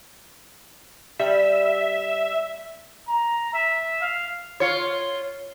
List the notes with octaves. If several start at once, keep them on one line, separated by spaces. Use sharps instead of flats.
G3 E5
A#5
E5
F5
F4 C#5